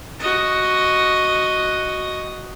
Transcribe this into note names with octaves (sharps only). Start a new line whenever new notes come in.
F#4 D#5